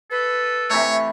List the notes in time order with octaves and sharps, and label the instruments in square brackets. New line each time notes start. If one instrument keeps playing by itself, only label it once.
[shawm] A4 [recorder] B4
[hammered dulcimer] C3 E3 A3 [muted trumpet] C#5